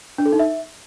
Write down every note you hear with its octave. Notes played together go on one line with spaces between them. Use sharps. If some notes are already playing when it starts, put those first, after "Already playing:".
D4
A4
D#4
E5